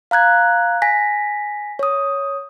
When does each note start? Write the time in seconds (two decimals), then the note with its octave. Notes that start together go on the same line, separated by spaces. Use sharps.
0.11 F5 A#5 F#6 G#6
0.82 G#5 A#6 B6
1.79 C#5 D#6